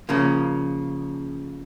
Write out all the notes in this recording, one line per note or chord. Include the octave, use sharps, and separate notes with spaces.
C#3 F3 A#3